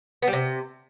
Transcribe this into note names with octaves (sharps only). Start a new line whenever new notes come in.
B3
G3
C3